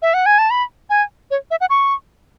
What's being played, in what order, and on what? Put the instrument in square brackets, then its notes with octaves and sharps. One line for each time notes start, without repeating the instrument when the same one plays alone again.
[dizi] E5
F#5
G#5
A5
B5
G#5
C#5
E5
F#5
C#6